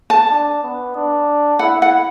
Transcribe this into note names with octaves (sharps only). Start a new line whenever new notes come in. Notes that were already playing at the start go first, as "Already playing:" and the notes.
A5
D4
B3
D4
E4 F#5
F#5